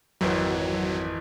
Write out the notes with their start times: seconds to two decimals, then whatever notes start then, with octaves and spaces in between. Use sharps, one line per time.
0.21 G#1 F2 E3 F#3